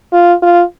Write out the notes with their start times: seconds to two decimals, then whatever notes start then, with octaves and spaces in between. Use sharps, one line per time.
0.13 F4
0.42 F4